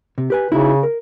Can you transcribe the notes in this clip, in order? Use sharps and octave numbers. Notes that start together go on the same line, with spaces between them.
C3
G4 B4 G#5
C#3 D#4 E4 F#4
A#4